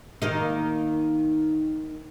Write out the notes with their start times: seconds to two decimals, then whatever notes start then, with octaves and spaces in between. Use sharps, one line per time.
0.22 D#3 A#3 D#4